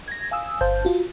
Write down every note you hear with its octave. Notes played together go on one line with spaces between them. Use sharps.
G#6 A#6
F5 G#5 D#6 E6
G1 C5 F5 A5 G6
F4 F#4